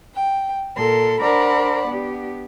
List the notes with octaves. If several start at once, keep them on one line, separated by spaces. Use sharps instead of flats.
G5
A#2 A4 A#4 C6
D4 A#4 C5 D5 F#5 B5
B3 D4 G4